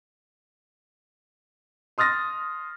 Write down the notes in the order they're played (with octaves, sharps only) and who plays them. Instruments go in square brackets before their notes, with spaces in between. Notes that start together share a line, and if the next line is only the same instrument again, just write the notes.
[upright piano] C6 D#6 F6 A6 A#6